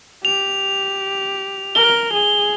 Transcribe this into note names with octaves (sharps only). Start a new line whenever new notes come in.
G4 F7
A#4 G7
G#4